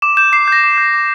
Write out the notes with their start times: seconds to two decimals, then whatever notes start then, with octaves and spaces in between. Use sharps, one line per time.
0.02 D6 E7
0.17 G6 E7
0.32 D6 C7
0.48 G6 A#6
0.64 D6
0.78 G6
0.94 D6